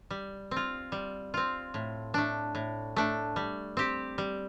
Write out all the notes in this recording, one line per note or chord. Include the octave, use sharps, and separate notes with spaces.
G3
C4
F4
G3
C4 F4
A2
A3 D4
A2
A3 D4
G3
C4 G4
G3